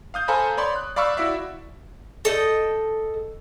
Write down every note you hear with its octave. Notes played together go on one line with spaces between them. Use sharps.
F5 D#6 G6
A4 C5 F5 G#5 A#5 B5
C#5 D5 B5 C6
F#6
D5 F5 B5 C#6 E6
E4 F#4 D5 E5
A4 D#5 G5